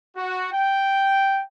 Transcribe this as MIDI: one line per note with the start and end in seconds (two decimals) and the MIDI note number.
0.16 0.50 66
0.53 1.41 79